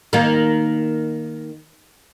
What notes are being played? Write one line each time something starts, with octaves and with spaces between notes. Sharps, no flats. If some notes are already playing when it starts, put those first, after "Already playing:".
D#3 A#3